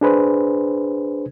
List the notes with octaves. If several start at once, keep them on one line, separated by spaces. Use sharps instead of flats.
D4 G#4 B4 C5